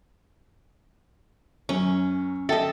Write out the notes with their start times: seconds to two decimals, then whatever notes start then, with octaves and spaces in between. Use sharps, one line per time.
1.69 F#2 C#4
2.49 A4 D#5 E5 G5 A5